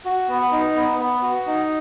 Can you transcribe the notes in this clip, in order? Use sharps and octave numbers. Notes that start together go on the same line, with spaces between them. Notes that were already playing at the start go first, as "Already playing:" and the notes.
F#4
B3
D#4
B3
B3
F#4
D#4